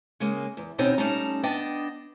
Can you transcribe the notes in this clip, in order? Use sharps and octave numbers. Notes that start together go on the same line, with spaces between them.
C#3 G#3 A#3
E2
D#2 B2 C4 C#4 D#4
G3 A3 C#4 D#4 A5 A#5
B3 D4 D#5 G5